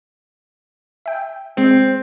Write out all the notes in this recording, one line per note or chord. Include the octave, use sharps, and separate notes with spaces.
E5 G5
G#3 C4